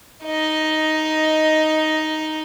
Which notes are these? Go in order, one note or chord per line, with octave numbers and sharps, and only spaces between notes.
D#4 D#5